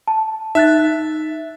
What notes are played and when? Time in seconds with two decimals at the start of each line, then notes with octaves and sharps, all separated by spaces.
0.08 A5
0.55 D#4 E5 F#6 A6